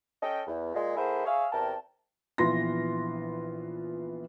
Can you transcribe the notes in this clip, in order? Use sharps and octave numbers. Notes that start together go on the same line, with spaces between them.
C#4 A4 D#5 G5
E2
A#2 G#3
A3 E4 G#4 A#4 C5 F#5
G#4 C#5 E5 F5
E2 C3 A#4 G5 A5
A#1 E3 B3 F4 C6 A#6